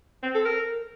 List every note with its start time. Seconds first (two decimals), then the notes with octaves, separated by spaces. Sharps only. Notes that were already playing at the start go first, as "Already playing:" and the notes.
0.23 C4
0.35 A4
0.45 A#4